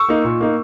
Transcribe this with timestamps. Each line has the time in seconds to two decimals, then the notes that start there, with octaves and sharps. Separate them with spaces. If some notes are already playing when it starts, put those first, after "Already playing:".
Already playing: C#6 E6
0.09 A#3 D#4
0.24 A#2
0.41 A#3 D#4